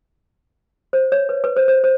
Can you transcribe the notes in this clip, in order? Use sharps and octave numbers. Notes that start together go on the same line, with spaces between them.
C5
C#5
B4
B4
C5
C5
C5